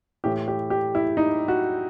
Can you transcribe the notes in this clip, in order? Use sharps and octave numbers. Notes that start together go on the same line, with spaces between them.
A2 E3 G4
G4
G4
E4
D#4
F#4